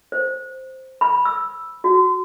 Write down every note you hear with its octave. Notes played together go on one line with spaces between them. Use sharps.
C5
B5
E6
F#4